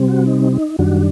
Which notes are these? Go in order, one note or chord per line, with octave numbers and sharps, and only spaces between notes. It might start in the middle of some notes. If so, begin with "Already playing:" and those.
Already playing: C3 G3 C4
F#4
D#4
D#4
F#2 D#3 G3 D4 F#4